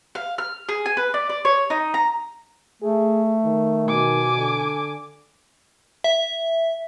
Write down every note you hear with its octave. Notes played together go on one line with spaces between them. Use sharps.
F5
F6
G#4
G#5
B4
D5
D5
C#5
D#4
A#5
A3 G#4
D#3
B2 G#5 D6
D3
E5